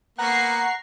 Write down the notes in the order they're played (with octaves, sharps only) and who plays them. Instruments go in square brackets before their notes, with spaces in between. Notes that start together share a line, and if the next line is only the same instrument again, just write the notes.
[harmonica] A#3 B3 [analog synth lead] F#5 [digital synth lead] A#5 [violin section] C#6 C7